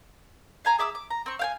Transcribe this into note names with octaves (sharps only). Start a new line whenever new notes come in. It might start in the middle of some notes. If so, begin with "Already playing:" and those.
F5 G#5 A#5
G#4 E5 D6 E6
D6
A#5
C4 C#6
F5 G5 G#5